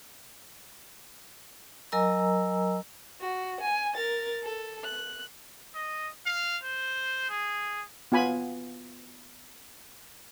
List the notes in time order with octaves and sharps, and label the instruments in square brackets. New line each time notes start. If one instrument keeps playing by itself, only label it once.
[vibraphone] F#3 A#4 D#5 G#5 A#5 E6
[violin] F#4
G#5
A#4 A6
A4
F#6
[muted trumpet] D#5
F5
C5
G#4
[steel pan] B3 F4 G#5 B5